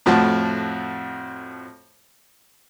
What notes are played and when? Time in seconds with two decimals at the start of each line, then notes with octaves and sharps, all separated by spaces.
0.06 F2 A2 F3 F#4 A5